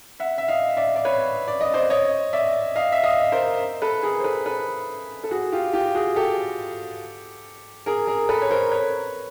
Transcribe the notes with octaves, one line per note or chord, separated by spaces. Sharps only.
E5 F#5
E5
D#5 F5
D5 E5
D5
B4 C#5
D5
D#5
C5 D5
C#5 D#5
D5 E5
D#5 F5
E5
D#5 F5
A#4 C5
A4 B4
G#4 A#4
C5
A4 B4
A4 B4
A4
F#4 G#4
F4 G4
F4 G4
F#4 G#4
G4 A4
G#4 A#4
G#4 A#4
A4 B4
C#5
A#4 C5
B4 C#5